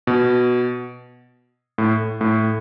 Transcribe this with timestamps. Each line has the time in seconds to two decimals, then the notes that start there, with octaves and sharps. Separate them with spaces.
0.07 B2
1.78 A2
2.21 A2